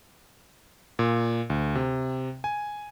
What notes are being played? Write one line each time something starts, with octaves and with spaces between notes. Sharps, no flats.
A#2
D2
C3
G#5